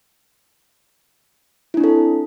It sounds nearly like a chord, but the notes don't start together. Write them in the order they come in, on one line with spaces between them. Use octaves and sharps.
E4 D4 C4 A4